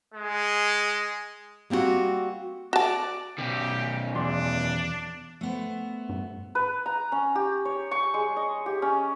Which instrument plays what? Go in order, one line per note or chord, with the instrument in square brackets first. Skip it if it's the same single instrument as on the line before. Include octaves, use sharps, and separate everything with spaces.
[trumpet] G#3
[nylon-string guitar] G3 A#3 C4 D4 F#4
[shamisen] F#4 A5 [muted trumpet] D5
[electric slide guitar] B2 D#3 [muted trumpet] G4
[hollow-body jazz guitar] E2 C6 [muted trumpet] D4
[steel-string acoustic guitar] A3 B3 C5
[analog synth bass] G2
[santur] B4
A#5
C#4
G4
C#5
C#6
G#3
D#5
G4
C#4